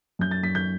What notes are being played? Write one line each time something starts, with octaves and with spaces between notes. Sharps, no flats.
F#2 G6
A6
F#2 B6
G6